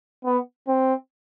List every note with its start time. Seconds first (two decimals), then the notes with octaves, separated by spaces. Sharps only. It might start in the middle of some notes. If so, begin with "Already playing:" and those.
0.25 B3
0.68 C4